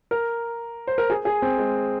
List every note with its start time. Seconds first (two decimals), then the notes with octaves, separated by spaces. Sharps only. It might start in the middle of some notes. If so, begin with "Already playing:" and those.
0.11 A#4
0.87 C5
0.98 A#4
1.10 G#4
1.25 G#4
1.42 C4
1.58 G#3